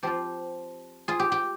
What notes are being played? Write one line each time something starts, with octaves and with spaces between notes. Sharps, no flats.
F3 C4 F4 G4
F4 G#4
G4
G4